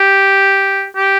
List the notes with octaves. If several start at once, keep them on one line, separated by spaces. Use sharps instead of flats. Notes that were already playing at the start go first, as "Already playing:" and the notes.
Already playing: G4
G4